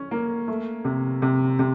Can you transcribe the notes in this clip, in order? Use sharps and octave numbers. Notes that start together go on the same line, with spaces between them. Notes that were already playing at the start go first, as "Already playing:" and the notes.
Already playing: C#4
A#3
A3
C3
C3
C3